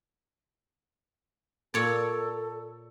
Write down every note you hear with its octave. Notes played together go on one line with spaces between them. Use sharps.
A#2 A4 C#5 D5